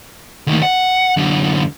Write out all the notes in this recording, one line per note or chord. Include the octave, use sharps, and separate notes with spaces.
D2 D#3
F#5
F#2 D3